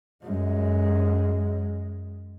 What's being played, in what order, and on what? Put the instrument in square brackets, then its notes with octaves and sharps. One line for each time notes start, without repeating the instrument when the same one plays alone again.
[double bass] F#2 G#3